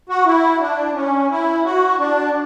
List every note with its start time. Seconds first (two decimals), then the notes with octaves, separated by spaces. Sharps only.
0.09 F#4
0.26 E4
0.61 D4
0.95 C#4
1.31 E4
1.65 F#4
1.99 D4